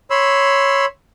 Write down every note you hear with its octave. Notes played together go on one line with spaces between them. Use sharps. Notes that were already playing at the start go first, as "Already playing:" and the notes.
C#5 B5 C6 E6